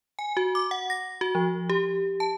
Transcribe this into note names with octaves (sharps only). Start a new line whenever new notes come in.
G#5
F#4
D6
F#5
A#6
F#4
F3
G4
A5